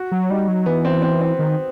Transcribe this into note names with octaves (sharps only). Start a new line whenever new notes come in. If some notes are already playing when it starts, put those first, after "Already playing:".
Already playing: F#4
F#3
G3 D#4
F#3
E3 B3
C4
C4
C4
D#3